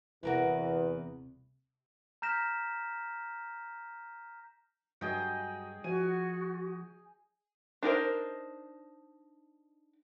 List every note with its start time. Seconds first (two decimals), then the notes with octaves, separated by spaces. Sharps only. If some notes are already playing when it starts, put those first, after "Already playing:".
0.23 D#1 E2 C3 E3 F#4 A#4 B4
2.22 A#5 F6 G6 A#6 B6 E7
5.01 G2 F#3 G#4 D#5 G5
5.84 F3 F#4 G#5 D#7
7.83 D4 D#4 A#4 C5